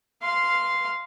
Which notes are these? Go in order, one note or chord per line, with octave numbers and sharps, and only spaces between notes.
F5 C6